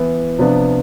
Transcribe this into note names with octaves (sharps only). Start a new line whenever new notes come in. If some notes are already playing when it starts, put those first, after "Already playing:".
Already playing: E3 B3 E4
C3 F3 B3 D4 F4